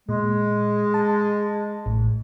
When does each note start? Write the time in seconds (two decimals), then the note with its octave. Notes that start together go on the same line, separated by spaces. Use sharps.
0.09 A#2 G#3
0.94 A5
1.86 A1 A2